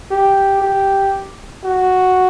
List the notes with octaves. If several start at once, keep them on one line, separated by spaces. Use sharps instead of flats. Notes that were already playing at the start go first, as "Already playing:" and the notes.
G4
G4
F#4